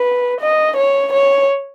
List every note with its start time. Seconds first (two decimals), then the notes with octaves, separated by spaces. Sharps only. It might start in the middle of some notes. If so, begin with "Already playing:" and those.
Already playing: B4
0.41 D#5
0.77 C#5
1.13 C#5